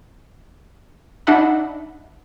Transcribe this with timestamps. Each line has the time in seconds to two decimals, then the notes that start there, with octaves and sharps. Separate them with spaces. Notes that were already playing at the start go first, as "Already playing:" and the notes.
1.27 D4 D#4 D#5 E5 F#5 B5